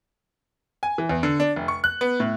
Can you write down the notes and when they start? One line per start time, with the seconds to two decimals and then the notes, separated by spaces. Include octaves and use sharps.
0.83 G#5
0.98 E3
1.09 E2
1.23 D3
1.40 D4
1.56 F1
1.68 C#6
1.84 F#6
2.01 B3
2.20 A2